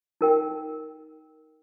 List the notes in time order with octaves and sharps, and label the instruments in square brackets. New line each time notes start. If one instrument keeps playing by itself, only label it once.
[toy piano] D#4 A#4 G5